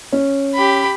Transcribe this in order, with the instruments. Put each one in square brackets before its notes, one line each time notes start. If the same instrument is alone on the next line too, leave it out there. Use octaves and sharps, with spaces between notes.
[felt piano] C#4
[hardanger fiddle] G4 B5